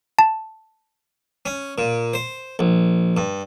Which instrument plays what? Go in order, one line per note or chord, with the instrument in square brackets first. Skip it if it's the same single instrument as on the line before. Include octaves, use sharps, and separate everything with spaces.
[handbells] A5
[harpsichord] C#4
A#2
C5
A#1
G2